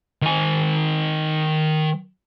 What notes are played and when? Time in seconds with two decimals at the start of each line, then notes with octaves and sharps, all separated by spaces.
0.22 D#3 G#5